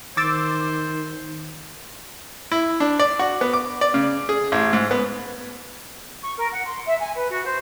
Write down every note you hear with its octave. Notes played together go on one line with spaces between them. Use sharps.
D#3 C5 D6 E6 A6
E4
D4
D5
F#4
B3
D6
D5
C#3
G#4
A1
G#2
B3
C#6
A#4
F#5
C6
E5
G#5
B4
F#4
C5